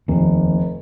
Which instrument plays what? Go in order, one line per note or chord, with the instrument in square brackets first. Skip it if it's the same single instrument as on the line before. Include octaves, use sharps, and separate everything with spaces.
[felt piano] F1 [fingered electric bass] D#2